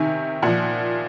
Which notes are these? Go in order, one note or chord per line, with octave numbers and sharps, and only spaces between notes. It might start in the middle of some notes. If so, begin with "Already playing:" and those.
Already playing: C3 D#3 G#5
A#2 F3 F#5